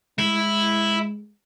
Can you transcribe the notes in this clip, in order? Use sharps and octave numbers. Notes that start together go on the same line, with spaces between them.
G#3 E4